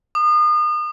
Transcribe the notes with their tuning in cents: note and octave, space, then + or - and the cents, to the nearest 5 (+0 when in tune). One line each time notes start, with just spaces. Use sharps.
D#6 -35